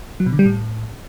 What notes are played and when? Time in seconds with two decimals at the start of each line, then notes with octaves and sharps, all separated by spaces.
0.20 F#3
0.26 B2
0.33 D3
0.39 G3
0.45 A2